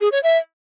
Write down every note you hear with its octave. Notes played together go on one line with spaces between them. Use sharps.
G#4
C#5
E5